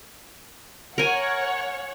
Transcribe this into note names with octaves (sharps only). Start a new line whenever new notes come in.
A#4 C#5 F#5 G#5